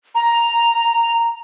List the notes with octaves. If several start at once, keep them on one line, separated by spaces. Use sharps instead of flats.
A#5